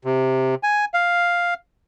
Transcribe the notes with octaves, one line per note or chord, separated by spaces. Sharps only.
C3
G#5
F5